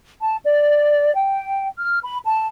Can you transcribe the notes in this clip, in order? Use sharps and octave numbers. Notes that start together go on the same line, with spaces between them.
A5
D5
G5
F6
B5
A5